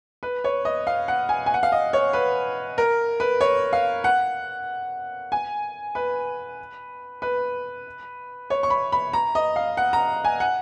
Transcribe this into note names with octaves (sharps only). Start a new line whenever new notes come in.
B4
C#5
D#5
F5
F#5
G#5
G#5
F#5
F5
D#5
C#5
B4
A#4
B4
C#5
F5
F#5
G#5
B4
B4
C#5
C#6
B5
B5
A#5
D#5
F5
F#5
A#5
G#5
F#5